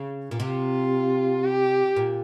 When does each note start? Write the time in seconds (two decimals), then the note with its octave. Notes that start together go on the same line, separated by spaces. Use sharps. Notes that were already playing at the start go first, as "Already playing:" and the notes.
Already playing: C#3
0.31 A#2
0.40 C3 F4
1.44 G4
1.96 A#2